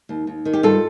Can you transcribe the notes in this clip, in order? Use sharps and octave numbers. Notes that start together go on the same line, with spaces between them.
D#2
D#2
D#3
G4
G2 F4 A4